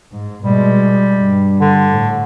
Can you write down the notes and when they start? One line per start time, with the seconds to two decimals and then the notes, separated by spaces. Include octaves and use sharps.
0.12 G#2
0.43 B2 G3 G#3
1.17 G2
1.60 D3
1.92 A2